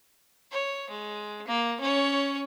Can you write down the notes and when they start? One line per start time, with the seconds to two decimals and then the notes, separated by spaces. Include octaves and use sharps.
0.52 C#5
0.90 G#3
1.48 A#3
1.81 C#4 C#5